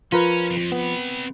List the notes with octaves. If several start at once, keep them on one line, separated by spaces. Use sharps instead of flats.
F3 C#4 F4 A#4 B4
F2
B3 C4 B5